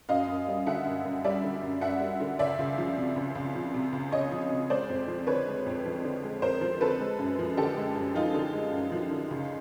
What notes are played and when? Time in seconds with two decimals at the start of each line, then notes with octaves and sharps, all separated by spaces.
0.09 F#2 D#5 F5
0.28 F#2
0.48 G3
0.66 D3 E5 F#5
0.85 F#2
1.05 F#2
1.24 G3 D5 E5
1.44 D3
1.62 F#2
1.81 F#2 E5 F#5
2.01 G3
2.20 D3
2.39 C#2 D5 E5
2.59 C#2
2.78 F3
2.97 C3
3.16 C#2
3.35 C#2
3.55 F3
3.74 C3
3.92 C#2
4.12 C#2 C#5 D#5
4.31 F3
4.50 C3
4.70 G#3 C5 D5
4.89 F2
5.08 F3
5.27 D3 B4 C#5
5.47 G#3
5.66 F2
5.86 F3
6.04 D3
6.23 G#3
6.42 F2 A#4 C5
6.61 F3
6.81 D3 A4 B4
7.00 G#3
7.19 F#2
7.39 F3
7.57 D3 G4 A4
7.77 G#3
7.96 F#2
8.15 F3 D#4 F4
8.34 D3
8.53 G#3
8.73 F#2
8.92 F3
9.11 D3
9.31 C#2